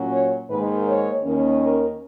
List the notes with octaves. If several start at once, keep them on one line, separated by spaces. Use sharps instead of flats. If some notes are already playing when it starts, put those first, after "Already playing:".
Already playing: A#2 F#3 C#4
C#5
G#2 D#3 A#3 B4
C#5
D#2 D#3 A#3 C#4
A#4